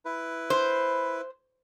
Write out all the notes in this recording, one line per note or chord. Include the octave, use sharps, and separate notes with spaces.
E4 B4
C5